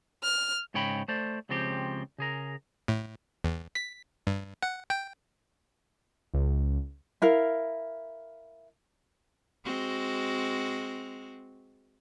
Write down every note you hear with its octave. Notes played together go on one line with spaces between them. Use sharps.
F6
G#2 C#3 C#5 G5 B5
A3 C5 D5
C#2 C#3 F3 C4 G4
C#3 G#4 A#4
A2
E2
B6
G2
F#5
G5
C#2
E4 A#4 F5
G#3 C4 F#4